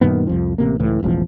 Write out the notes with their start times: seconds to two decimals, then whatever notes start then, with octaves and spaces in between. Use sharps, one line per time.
0.01 F#2 A#2 D#3 B3
0.27 C2 F2 F3
0.58 A1 C3 A#3
0.79 C#2 A2 E3
1.03 E1 A1 E2 F3